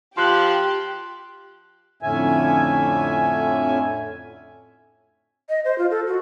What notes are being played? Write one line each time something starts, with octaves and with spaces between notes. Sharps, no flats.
F3 G4 C6 F#6 F#7
F2 A2 D3 C#4 E5 G#5
D#5
C5
F4
A4
F#4